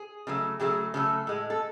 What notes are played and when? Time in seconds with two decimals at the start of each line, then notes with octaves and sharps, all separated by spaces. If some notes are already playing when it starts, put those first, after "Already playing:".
Already playing: G#4
0.27 C#3 F#3 A3
0.60 C#3 F#3 A3 G#4
0.94 C#3 F#3 A3 A4
1.27 A2 G#3
1.50 A4